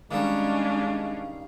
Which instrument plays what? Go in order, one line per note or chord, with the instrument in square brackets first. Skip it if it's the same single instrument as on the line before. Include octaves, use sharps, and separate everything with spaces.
[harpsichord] D#3 G3 [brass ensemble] G#3 [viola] C#4 D4 [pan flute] F5